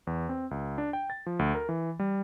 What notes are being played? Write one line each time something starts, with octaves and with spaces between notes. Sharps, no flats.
E2
C4
C#2
D4
G5
A6
F3
D2
A#4
E3
G3